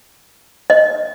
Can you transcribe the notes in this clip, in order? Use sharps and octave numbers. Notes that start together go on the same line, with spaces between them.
D#5